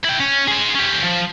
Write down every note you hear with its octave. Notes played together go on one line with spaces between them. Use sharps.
E4 G5
C#4
G#4 C5
C#4 G4
F3